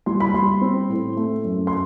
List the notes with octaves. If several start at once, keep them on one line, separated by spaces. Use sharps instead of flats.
G3 C6
B5
G3 C6
C4
A2
A3
F#2
C6